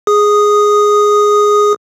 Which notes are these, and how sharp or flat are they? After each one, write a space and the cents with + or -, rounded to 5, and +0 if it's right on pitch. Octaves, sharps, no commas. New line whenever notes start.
G#4 +0 D#6 -5